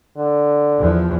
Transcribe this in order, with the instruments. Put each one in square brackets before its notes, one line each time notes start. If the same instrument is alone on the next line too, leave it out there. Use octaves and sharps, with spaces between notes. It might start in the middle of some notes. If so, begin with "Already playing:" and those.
[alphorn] D3
[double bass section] E2 F3